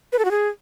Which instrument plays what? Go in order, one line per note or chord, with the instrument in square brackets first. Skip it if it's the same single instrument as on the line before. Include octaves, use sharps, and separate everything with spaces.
[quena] B4
A4
F#4
G#4